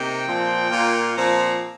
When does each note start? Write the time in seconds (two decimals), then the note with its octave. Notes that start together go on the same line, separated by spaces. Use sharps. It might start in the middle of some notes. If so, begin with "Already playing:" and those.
Already playing: C3 A#3 D#4 G5
0.26 A#2 F3 C4
0.70 A#2 A#3 F4
1.16 A#2 F3 C4 A#5